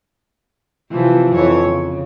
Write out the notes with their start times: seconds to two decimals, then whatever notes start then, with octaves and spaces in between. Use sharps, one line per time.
0.91 C3 E3 F3
1.34 F2 E3 C#5
1.65 C#3